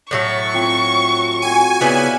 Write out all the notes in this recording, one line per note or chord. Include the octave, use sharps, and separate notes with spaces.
A2 F#3 A4 C#6
C4 F4 C#5
C4 F#4 G#5
C#3 B3 E4 C#5 D5 F5